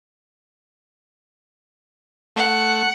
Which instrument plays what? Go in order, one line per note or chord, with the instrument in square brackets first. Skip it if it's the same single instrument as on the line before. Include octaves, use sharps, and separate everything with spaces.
[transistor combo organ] A3 [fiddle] F#5